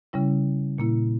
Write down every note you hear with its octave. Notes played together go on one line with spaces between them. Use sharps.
C#3 G3 C#4 E4
A#2 A#3 E4